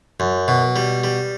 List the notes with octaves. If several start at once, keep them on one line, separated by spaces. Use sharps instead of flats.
F#2
B2
G3
G3